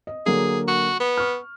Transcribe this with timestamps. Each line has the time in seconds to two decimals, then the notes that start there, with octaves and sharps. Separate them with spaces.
0.07 D#5
0.26 D3 F#3 A#3 G#4
0.68 F#4
1.00 B3
1.17 C#6 F6